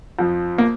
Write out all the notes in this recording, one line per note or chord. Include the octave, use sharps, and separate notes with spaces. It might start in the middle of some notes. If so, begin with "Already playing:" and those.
F2 F3
A#3